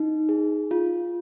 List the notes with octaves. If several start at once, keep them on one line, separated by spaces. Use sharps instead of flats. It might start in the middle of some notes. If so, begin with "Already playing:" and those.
Already playing: D#4
G#4
F4